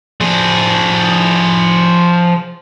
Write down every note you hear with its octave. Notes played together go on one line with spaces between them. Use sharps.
F3 G#4